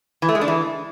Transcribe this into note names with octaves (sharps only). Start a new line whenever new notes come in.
E3
A3
G#3
D4
E3